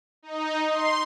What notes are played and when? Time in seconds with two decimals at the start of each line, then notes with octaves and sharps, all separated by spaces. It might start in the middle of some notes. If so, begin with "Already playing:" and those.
0.22 D#4
0.68 C6